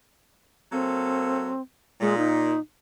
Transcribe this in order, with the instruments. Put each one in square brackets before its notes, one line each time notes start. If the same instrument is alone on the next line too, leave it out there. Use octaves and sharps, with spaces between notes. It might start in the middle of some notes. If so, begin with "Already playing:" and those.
[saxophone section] F#3 A#3 A4 [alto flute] C4
[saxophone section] A#2 [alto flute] G#3
[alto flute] D#4